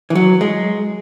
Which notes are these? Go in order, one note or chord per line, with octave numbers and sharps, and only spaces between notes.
E3
F#3
G#3